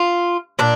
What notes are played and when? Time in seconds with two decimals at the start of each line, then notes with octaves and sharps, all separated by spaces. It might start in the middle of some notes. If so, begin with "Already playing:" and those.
Already playing: F4
0.59 A#2 D4